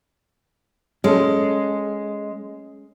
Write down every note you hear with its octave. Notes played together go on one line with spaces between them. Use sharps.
G#3 C#4 A4